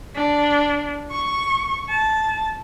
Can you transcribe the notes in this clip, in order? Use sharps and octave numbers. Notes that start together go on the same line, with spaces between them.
D4
C#6
A5